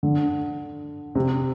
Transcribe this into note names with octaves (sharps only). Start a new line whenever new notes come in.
D3
C3